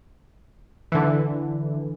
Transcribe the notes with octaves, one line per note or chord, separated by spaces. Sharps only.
D3 E3